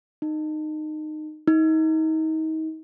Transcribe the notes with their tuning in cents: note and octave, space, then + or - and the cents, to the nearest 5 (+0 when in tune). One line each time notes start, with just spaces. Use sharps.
D#4 -20
D#4 +30